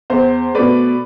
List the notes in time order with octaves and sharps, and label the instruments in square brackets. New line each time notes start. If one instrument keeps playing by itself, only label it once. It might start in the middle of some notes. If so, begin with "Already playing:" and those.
[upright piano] E2 C5
B2 A3 B4 D5